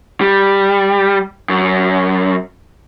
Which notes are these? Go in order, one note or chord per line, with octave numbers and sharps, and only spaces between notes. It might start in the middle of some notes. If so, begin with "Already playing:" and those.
G3
F#2